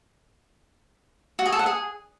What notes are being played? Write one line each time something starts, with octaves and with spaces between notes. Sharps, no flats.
F#4
G#4
A4
F#5
G#4